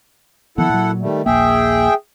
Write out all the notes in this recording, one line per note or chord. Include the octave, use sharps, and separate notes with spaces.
D#3 F3 B3 E4 A4 F#5
A#2 F#3
D#3 G3 A3
D#1 A#1 A#3 G#4 E5 G5